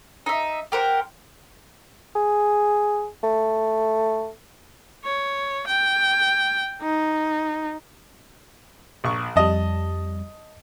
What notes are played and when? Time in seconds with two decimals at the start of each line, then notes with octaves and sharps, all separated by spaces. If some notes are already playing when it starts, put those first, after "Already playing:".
0.26 D#4 E5
0.72 G4 A#4 C5 F#5
2.15 G#4
3.23 A3
5.04 C#5
5.67 G5
6.82 D#4
9.04 A#1 C#6
9.36 F2 G3 D#5 A5